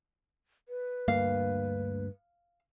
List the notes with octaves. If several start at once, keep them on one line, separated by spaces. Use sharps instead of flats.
B4
D2 G2 A#3 F5